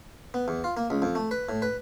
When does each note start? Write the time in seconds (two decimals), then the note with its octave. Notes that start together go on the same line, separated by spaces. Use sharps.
0.34 B3
0.48 E2
0.64 F4
0.77 A#3
0.90 C#2
1.02 F2
1.15 A3
1.31 B4
1.49 A2
1.62 B4